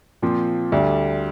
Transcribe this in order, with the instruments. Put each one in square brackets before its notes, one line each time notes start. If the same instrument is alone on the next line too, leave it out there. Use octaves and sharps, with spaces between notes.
[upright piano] A#2 F3 C4
D2 D3 G3 D4